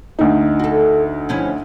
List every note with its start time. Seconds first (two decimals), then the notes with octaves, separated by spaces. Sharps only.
0.19 D2 D#4
0.60 F#4 A4
1.29 F3 C#4 E4